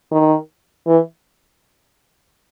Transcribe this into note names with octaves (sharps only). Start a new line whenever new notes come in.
D#3
E3